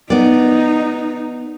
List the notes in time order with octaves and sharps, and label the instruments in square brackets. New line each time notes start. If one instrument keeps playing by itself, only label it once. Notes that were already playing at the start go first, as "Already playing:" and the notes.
[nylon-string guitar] B3 D5 [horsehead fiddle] D#4